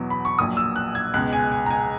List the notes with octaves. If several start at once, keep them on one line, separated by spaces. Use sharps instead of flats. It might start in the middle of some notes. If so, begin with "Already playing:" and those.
Already playing: E2 B2 F#3
B5
C#6
A#1 A#2 F#3 D#6
E6
F#6
G#6
C#2 B2 G#3 F#6
G#5
G#5
A#5
G#5